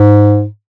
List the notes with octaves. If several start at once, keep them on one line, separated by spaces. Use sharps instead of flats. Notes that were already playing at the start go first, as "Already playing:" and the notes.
Already playing: G#2